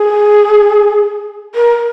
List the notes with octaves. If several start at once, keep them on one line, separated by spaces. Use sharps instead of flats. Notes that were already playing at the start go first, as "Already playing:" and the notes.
Already playing: G#4
A#4